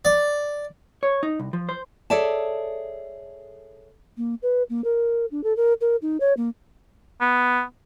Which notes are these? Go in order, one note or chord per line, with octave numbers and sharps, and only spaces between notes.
D5
C#5
D#4
C2
F3
C5
G#4 A4 C#5 D5 E5 A5
A#3
B4
A#3
A#4
D4
A4
A#4
A#4
D#4
C#5
A#3
B3